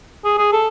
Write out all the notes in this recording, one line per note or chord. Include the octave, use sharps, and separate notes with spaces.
G#4
G#4
A4